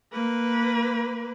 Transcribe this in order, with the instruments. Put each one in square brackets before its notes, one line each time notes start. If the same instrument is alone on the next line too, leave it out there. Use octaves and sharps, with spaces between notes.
[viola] A#3 B4